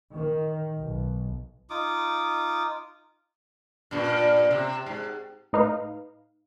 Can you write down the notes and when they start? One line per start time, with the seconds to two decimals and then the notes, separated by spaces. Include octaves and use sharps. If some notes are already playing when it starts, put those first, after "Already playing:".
0.15 D#3
0.78 B1
1.70 D#4 F4 D6 D#6
3.91 G2 A#2
4.51 C3
4.86 G#2
5.53 A2 D#4 B4 F5